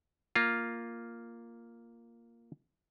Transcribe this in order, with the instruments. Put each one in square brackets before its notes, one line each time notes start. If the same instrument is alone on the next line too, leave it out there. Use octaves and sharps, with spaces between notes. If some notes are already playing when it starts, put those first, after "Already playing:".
[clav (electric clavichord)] A#3 F4